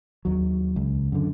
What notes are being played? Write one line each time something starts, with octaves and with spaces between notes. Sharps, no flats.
D#2 F#3
C#2
F#2 D3